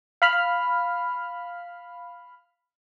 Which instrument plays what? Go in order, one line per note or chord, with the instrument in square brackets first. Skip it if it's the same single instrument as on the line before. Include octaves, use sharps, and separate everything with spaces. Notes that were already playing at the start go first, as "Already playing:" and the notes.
[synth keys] F5 B5 F6